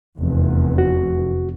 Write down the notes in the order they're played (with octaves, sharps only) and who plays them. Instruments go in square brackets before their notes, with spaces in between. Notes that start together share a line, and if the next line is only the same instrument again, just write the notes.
[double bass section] F1 E2
[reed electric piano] F#4